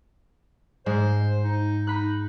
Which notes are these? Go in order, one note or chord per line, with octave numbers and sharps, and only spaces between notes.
G#2 G#3 C5
D#4
D#4 B5 F#6